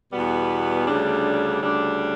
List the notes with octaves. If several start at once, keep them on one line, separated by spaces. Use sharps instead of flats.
E2 B2 G3 B3
D2 C#3 G3 D4
D2 C#3 G3 D4